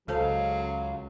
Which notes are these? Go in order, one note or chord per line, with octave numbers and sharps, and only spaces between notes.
C#2 F#3 A4 C5 F5 A5